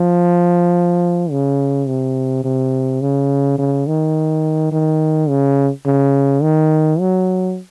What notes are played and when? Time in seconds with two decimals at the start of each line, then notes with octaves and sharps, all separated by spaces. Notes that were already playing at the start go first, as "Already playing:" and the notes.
Already playing: F3
1.31 C#3
1.87 C3
2.44 C3
3.01 C#3
3.58 C#3
3.87 D#3
4.72 D#3
5.29 C#3
5.86 C#3
6.42 D#3
7.00 F#3